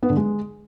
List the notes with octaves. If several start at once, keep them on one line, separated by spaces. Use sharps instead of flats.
B3
D3
G#3